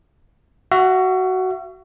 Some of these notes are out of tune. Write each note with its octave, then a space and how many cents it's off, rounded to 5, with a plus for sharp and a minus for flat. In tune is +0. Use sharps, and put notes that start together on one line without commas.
F#4 +10 E5 +45